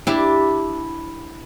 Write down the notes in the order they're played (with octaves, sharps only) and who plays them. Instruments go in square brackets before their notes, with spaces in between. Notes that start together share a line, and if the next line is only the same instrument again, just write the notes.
[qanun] D4 E4 [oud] G4